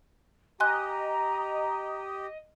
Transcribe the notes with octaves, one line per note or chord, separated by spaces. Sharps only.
G4 D#5 G#5 A#5 C6 F#6